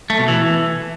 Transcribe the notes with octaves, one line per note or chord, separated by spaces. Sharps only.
A3
B2
E3